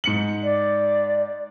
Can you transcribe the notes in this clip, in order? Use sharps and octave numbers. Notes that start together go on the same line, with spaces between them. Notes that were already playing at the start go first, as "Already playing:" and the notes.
G#2 C#7 F#7
D5